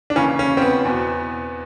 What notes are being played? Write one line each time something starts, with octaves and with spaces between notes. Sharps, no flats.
D4
D#2 C#3 E3 C#4
C#4
C4
B3
E2 B2